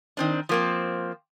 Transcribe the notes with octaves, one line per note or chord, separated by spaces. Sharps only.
D#3 C4 D4
F3 A#3 C4